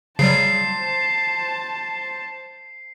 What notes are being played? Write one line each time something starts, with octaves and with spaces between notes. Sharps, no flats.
C#3 F#3 G3 C5 A5 C7